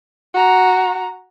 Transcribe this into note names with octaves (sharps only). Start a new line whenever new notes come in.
F#4 A#5